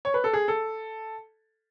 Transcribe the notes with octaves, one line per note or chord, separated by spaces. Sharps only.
C#5
B4
A4
G#4
A4